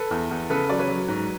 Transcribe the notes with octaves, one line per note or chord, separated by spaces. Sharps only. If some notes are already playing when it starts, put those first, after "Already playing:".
Already playing: A4 B4
E2
E2
C#3 A4 B4
F#3 D5
B4 C#5
F#3
G#2